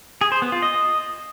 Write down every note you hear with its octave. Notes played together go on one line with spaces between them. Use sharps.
G#4
C5
B3
F4
D#5